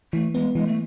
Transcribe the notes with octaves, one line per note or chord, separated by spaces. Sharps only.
E3 A3
G#3 B3
E3 G#3
A3